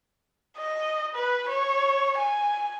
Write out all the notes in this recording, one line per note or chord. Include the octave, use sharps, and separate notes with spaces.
D#5
B4
C#5
G#5